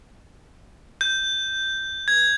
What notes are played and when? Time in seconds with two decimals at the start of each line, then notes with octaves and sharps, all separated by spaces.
1.01 G6
2.08 G#6